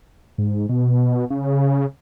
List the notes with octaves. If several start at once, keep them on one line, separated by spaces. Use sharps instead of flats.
G#2
B2
C#3